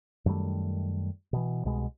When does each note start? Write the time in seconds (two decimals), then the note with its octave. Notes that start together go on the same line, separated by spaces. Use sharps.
0.26 F#2 D#3 G3 A3
1.33 B2 E3
1.65 C2 B2 G#3